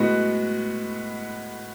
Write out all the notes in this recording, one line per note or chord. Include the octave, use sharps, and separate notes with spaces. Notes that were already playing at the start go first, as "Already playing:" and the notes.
Already playing: A2 G#3 B3 F#4